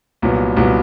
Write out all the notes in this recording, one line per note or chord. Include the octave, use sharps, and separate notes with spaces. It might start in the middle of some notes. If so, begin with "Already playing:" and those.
C2 A#2 F#3 B3
C2 A#2 F#3 B3